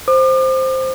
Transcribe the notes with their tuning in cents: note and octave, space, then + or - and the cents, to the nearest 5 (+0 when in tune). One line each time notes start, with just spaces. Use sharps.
C5 +0 D6 +45